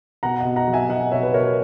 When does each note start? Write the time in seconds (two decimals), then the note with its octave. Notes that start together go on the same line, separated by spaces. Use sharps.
0.23 B2 F#5 A#5
0.40 B2 D#5 F#5
0.56 F#5 A#5
0.67 F#3
0.73 E5 G#5
0.89 F#3 D#5 F#5
1.12 B2 C#5 E5
1.23 B4
1.33 B2 A#4 C#5